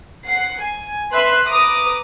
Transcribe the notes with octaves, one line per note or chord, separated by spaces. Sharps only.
F#5 C7
G#5
B4 E5 C6 F#6
B4 A#5 D6 D#6